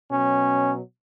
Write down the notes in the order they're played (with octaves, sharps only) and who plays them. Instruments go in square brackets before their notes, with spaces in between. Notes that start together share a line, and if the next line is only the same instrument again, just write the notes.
[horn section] B2 F#3 C#4